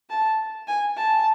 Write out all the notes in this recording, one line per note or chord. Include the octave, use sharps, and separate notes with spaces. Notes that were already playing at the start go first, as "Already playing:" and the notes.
A5
G#5
A5